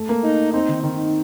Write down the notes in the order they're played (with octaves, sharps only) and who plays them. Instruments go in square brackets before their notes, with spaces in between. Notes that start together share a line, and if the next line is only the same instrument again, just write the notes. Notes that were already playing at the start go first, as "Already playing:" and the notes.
Already playing: [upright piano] A3
A#3
[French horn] D#4
[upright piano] C4 [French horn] D#4
[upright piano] D#3
[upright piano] D#3 [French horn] D#4